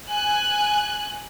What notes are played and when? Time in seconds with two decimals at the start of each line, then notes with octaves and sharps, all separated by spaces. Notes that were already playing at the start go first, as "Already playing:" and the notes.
0.10 G#5 F#6